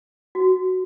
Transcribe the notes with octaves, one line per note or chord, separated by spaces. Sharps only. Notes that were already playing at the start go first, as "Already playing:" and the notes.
F#4